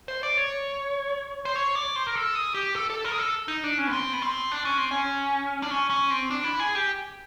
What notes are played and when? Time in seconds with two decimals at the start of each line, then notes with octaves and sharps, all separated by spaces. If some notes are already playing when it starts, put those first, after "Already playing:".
0.08 C5
0.23 D5
0.37 C#5
1.45 C5
1.56 C#5
1.75 D5
1.96 C5
2.07 A#4
2.15 A4
2.35 G#4
2.55 G4
2.75 A4
2.90 A4
3.05 A#4
3.12 G#4
3.18 A4
3.48 D#4
3.64 D4
3.78 C#4
3.87 B3
3.93 C4
4.13 B3
4.22 C4
4.52 D4
4.65 C#4
4.78 C4
4.91 C#4
5.62 D4
5.71 C#4
5.90 C#4
6.10 C4
6.31 D4
6.44 E4
6.60 G#4
6.75 G4